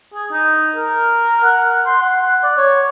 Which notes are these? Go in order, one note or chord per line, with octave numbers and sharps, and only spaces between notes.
G#4
D#4
A#4
F#5
C6
F#5
D5
C#5